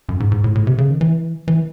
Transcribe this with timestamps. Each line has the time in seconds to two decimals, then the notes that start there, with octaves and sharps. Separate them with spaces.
0.09 F#2
0.20 G#2
0.32 G#2
0.44 A2
0.55 A2
0.67 C3
0.78 C#3
0.89 D#3
1.01 E3
1.48 E3